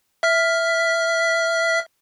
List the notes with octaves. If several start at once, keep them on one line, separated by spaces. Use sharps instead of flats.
E5 F6 B6